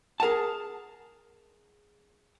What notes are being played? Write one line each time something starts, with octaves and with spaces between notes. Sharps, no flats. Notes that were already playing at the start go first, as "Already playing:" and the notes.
G#4 A#4 F#5 A5